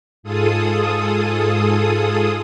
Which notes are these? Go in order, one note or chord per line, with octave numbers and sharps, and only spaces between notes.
G#2 F4 G#4 A4 D#6